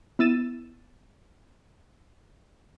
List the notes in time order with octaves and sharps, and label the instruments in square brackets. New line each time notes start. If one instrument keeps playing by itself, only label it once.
[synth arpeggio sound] B3 E4 E6 A6 D#7 E7